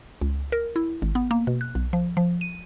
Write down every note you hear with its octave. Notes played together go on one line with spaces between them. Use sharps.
C#2
A#4
E4
G#1
B3
A#3
B2
F#6
B1
F3
F3
D#7